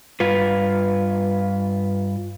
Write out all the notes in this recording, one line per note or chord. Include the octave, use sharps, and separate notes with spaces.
G2 F4 B4